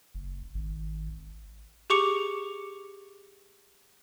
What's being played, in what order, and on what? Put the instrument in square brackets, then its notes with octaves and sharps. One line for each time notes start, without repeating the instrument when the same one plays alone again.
[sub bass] F#1
G#1
[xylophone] G4 G#4 C#6 D6 C#7 F7